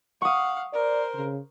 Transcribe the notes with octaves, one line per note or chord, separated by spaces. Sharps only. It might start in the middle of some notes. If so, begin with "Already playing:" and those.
F5 F#5 C#6 D#6
A#4 C5 D5
C#3